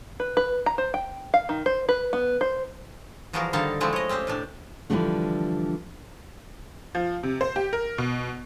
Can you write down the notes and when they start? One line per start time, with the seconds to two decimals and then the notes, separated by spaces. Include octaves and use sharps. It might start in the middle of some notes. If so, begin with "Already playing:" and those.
0.20 B4
0.37 B4
0.66 A#5
0.78 C5
0.94 G5
1.34 F5
1.49 D#3
1.66 C5
1.89 B4
2.13 B3
2.41 C5
3.33 E3 F3 G3 F#4 G#4 A#4
3.53 D3 D#3 G3 D#4 A4 F5
3.80 F3 G#3 A3 C4 E4
3.93 C#5 D#5
4.09 C4 C#4 G4 C5
4.27 A2 C3 D4
4.90 D3 E3 F3 G3 A3 D4
6.95 F3
7.23 C3
7.41 C5
7.56 G4
7.73 A#4
7.98 B2